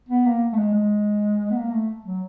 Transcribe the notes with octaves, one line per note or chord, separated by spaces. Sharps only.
B3
A#3
A3
G#3
G#3
B3
A#3
A3
F#3